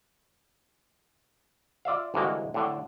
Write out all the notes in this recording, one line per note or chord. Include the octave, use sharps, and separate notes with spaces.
F4 D5 E5 F5
C2 D3 E3 G#3 A#3 F#4
A2 D3